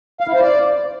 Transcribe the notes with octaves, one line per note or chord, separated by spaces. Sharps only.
F5
E4
C5
D5